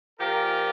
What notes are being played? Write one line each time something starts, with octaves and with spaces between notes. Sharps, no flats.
A#2 F3 G4 A#4